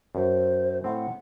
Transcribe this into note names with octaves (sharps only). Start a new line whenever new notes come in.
F#2 C5
A2 C4 F#5